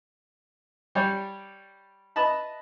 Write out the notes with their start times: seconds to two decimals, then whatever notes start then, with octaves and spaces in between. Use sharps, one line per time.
0.95 G3 G4 C#5 D5
2.16 B4 D#5 E5 A5 B5